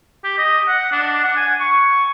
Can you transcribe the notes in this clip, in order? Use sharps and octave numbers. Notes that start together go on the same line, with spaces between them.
G4
D#5
F#5
D4
F#5
G#5
C#6